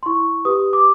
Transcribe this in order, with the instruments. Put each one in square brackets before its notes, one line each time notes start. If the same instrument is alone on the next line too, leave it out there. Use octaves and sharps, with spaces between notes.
[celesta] C6
E4 C#6
G4 B4 D#6
D6